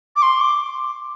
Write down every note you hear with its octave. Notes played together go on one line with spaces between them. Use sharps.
D6
C6
D6